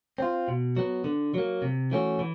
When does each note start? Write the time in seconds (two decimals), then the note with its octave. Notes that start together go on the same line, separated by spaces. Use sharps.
0.18 C4 F4
0.48 B2
0.77 F#3 B3
1.04 D3
1.34 F#3 A#3
1.62 C3
1.91 E3 A3 C#4 F#4
2.19 E3